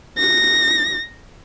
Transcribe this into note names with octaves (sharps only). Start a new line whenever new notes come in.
A#6